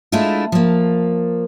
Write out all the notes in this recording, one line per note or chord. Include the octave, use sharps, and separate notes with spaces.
G#3 A3 D4 E4 F4
F3 A#3